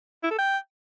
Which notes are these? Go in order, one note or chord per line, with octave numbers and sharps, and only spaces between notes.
E4
A4
G5